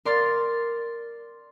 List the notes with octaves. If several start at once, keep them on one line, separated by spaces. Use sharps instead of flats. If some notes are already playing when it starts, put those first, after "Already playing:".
A#4 D5 C6 F6 A6